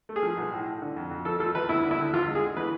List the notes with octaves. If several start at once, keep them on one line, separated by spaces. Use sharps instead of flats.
A3
G#4
F3
B1
A2
A2
D3
F2
F2
F3 A4
F3 A4
E2 B4
D2 E4
D3
E4
D2
E2 F4
G#3
G#4
D3
E3 B4